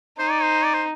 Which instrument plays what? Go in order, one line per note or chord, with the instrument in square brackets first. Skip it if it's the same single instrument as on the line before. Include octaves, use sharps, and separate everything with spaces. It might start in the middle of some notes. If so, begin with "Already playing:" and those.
[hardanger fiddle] D#4 [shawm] C5
[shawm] D5
C5
D5
C5